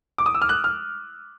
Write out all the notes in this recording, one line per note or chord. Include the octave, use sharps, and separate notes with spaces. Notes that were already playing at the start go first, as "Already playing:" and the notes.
D6
D#6
E6
F6
F#6
F6